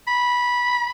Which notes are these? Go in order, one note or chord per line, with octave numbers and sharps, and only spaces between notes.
B5